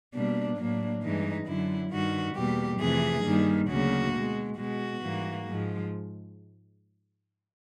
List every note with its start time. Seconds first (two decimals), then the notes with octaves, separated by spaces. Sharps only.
0.13 B2 G3 A#3 D4
0.57 A2 F#3 A#3 D4
1.02 G2 E3 G#3 D#4
1.46 F#2 D3 F#3 E4
1.91 G2 D#3 G3 F#4
2.35 E2 B2 G3 A#3 G4
2.80 F2 C3 E3 A3 G#4
3.24 G2 D#3 G3 A#3
3.68 D2 C#3 F#3 A#3 F#4
4.13 B2 G#3
4.57 B2 G#3 F#4
5.02 G#2 E3 G3 A#3
5.46 G#2 F3 G#3